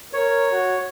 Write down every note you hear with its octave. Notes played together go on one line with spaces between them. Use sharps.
A#4 C#5
F#4